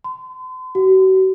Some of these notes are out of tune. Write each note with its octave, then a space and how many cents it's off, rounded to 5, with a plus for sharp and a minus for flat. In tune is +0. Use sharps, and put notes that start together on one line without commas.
C6 -40
F#4 +40